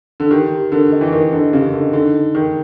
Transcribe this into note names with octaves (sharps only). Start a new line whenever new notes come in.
D3
D#3 G4
G4
D3 A#4
D#5
E3
D#3 A#4
D3 D#5
C#3 G4
D3 D#5
D3 D#4
D#4
D#3 G#4